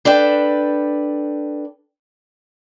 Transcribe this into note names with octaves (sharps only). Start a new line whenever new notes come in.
D4 A4 B4 G5